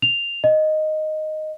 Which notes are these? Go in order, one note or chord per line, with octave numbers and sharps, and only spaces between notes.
F7
D#5